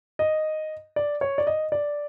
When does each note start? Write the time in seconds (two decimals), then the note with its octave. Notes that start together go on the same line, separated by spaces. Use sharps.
0.19 D#5
0.96 D5
1.21 C#5
1.38 D5
1.47 D#5
1.72 D5